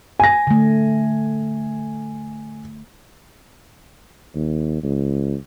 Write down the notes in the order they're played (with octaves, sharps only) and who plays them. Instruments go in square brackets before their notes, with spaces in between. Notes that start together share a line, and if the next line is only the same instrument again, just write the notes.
[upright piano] G#5 A#6
[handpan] D3 A3
[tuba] D#2
C#2